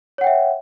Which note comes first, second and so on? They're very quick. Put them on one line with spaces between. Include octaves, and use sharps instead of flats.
C#5 F#5 G5 E5